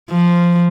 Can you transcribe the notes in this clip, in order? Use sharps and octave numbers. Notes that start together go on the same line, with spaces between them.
F3